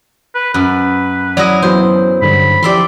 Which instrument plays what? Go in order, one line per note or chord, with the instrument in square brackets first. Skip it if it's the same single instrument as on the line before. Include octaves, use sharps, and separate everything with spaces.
[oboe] B4
[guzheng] F#2 [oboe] B4
[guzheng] F#3 E4 D#5 [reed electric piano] D5
[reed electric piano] E3 F#3 B3 [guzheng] C5
[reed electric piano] G2 D3 [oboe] B5
[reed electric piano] E3 F3 G4 [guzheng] D5 E5 C6